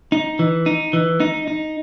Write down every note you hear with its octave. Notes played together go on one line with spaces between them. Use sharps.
D#4
E3
D#4
E3
D#4
D#4